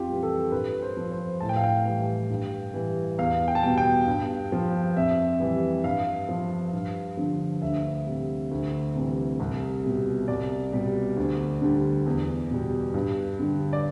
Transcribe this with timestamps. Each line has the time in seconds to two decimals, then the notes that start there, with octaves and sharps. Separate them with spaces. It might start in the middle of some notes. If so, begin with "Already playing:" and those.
Already playing: F2 F4 G4
0.08 E3 G3
0.23 A4
0.52 G2 B4
0.82 C5
0.97 F3
1.12 C5
1.40 A2 A5
1.49 G5
1.56 F5
1.64 G5
1.85 E3 G3
2.30 G2
2.74 E3 G3
3.18 E2 F5
3.48 G5
3.55 A5
3.62 B2 G3 G5
3.78 G5
4.07 G2
4.52 F3
4.96 F2 E5
5.40 E3 G3
5.84 G2 F5
6.29 F3
6.73 G2
7.17 D3 F3
7.62 D2 E5
8.06 C3 G3
8.51 D2
8.95 C3 E3 G3
9.40 C2
9.84 B2 G3
10.28 C2 D5
10.72 B2 G3
11.17 D2
11.62 D3 G3
12.06 E2
12.50 B2 G3
12.94 G2
13.39 D3 G3
13.73 D5